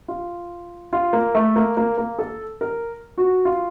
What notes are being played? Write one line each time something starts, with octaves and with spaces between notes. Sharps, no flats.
F4
F4
A#3
A3
A#3
A#3
A#3
A4
A#4
F#4
F4